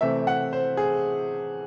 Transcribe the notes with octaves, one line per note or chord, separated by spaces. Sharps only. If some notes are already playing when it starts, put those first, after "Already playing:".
C3 E3 A3 C4 E5
F#5
C5
G#4